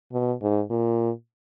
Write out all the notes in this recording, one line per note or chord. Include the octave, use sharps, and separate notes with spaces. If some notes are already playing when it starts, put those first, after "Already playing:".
B2
G#2
A#2